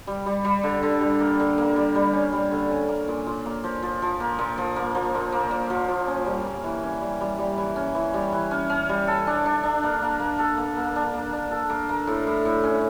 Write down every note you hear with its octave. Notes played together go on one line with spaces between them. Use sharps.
G3
G3
G3
D3
D3
G3
A#3
D3
A#3
G3
G3
C#4
G3
D3
C#4
A#3
A#2
A#2
A#3
F3
F3
F3
A#3
A#2
F3
A#3
F3
A#2
A#3
A#2
F3
F3
C#4
G3
A#3
E3
C#4
G3
G3
G3
E3
C#4
E3
G3
E3
C#4
C#4
G3
A4
D4
D4
D4
A#3
A#3
A#3
A4
A#3
A#3
D4
A#3
D4
A4
A#3
A#3
A2
A2
A2
C#4